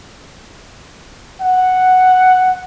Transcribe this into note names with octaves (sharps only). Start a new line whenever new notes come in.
F#5